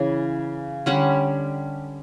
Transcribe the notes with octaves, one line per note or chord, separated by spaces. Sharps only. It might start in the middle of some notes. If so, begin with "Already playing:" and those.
Already playing: C#3 E3
D3 G3 C#4 F#5